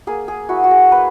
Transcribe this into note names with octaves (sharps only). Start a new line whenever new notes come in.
A#3 G#4
G#4
E4 F#4
F#4
G#4
A#3 B4